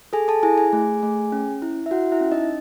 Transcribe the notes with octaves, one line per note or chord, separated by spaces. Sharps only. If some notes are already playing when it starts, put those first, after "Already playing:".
G#4 A4 G#5
A4 A5
E4 G#4 G#5
G#4 G#5
A3
A3
C#4
E4
E5
E4 F#4 F#5
E4 E5
C#4
D#4 D#5